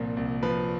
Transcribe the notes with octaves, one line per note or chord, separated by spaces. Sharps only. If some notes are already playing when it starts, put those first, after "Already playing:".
Already playing: C2 A#2 F3
C2
F3 B4